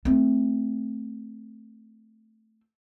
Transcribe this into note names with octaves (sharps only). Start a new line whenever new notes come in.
A3 C4